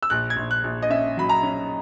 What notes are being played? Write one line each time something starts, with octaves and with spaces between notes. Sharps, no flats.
E6
A#1 F#6
G#6
A#1
F#6
A#1
D#5
C#4 E5
F#3 B5
A#5
C#4